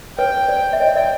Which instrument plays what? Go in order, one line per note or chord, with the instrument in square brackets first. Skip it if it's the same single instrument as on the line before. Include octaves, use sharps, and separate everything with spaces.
[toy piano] B4 C#5 [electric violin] G5
[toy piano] C5 D5
E5
[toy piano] C#5 D#5 [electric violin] G5
[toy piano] D5 E5